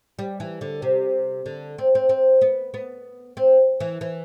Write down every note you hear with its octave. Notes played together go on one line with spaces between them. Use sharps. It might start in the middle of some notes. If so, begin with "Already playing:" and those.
G3
E3
D3
C3
D3
C4
C4
C4
B3
B3
C4
E3
E3